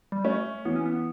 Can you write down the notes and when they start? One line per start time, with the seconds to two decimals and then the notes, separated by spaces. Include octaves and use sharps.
0.12 G3
0.25 A3 C#4
0.65 E3 B3
0.76 C#4
0.86 B3